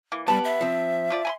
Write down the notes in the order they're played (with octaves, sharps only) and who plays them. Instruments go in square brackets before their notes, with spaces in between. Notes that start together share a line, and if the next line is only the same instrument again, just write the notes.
[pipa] E3 A#3
[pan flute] G3 [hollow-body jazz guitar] B3 G4 [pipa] A5 B5
[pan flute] E5
[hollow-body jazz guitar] F3 C4
[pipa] F3 F4 D5
G#5 B5 C6